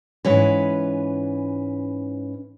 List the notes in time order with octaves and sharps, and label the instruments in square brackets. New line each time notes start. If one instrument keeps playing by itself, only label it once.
[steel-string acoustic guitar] G#2 E3 C#4 B4